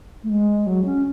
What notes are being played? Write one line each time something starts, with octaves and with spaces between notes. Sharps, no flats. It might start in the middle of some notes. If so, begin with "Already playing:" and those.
A3
G#3
F#3
C#4